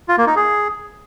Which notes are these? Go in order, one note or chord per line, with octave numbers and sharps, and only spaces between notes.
F4
A#3
D#4
G#4